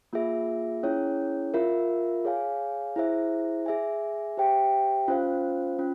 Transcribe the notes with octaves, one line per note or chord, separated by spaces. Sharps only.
A#3 F4 G#4 E5
C#4 E4 G#4 C#5
F4 A#4 E5
G#4 C#5 F5 G#5
E4 G#4 C5 E5
G#4 E5 G#5
G4 C5 E5 G5
C#4 F4 C5 F5
C#4 F4